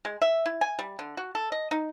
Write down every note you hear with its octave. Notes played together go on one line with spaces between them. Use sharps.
G#3
E5
E4
G#5
G3
D3
F#4
A4
D#5
D#4